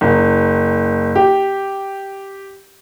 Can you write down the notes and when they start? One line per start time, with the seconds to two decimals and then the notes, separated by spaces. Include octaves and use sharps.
0.01 F#1
1.15 G4